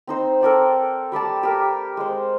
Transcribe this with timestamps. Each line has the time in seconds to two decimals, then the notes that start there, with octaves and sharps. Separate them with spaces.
0.07 C4 D#4 C5
0.41 A4 A#4 D5 G5
1.12 G3 G4 D5 A5
1.43 G4 A#4
1.97 G#3 C5